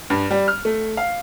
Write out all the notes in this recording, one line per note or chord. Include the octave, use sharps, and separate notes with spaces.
G2
G3
F6
A3
F5